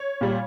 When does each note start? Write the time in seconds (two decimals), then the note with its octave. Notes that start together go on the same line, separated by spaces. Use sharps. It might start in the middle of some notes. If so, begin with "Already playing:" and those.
Already playing: C#5
0.21 A#2 G3